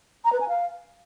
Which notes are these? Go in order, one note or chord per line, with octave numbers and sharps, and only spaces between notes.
A#5
B4
G#5
F5